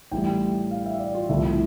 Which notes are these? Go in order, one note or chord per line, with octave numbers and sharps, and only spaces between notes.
A1 A2 G3 G5
F5
E5
D5
F4
C2 C3 F3 A3 E4